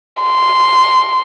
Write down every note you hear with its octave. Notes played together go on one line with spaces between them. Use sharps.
C6